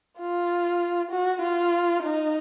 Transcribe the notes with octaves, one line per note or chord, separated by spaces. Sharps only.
F4
F#4
F4
D#4